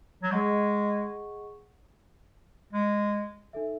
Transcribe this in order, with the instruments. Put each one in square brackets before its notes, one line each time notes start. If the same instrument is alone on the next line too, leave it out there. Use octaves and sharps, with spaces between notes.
[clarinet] F#3
[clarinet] G#3 [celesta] G#4 D#5 F#5 C#6
[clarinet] G#3
[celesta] D#4 A4 E5